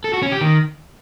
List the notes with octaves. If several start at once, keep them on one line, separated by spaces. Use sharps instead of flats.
A4
F#4
C#4
G4
D#3